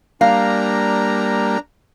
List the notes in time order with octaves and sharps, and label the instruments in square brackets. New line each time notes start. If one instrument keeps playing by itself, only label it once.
[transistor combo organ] G3 A#3 [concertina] D4 A#5 [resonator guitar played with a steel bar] F5